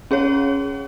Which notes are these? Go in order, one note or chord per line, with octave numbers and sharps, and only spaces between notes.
C#4 G#4 C#5